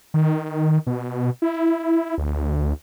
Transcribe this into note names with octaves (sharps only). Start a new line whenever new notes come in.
D#3
B2
E4
D2